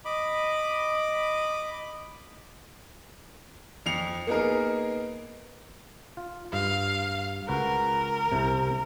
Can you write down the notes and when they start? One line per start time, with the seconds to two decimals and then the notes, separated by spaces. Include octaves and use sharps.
0.05 D#5 B5 D6
3.86 F2 C7 C#7 F7
4.27 A#3 B3 D#4 G#4 A#4
6.17 F4
6.53 G2 F5
7.48 C#2 F#4 A#4 B4
8.32 C2 C3